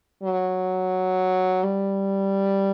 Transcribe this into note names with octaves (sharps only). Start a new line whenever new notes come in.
F#3
G3